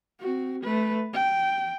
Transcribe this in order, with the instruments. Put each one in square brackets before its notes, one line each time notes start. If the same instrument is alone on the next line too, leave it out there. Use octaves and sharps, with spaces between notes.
[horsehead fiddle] C4 F#4
A3 B4
G5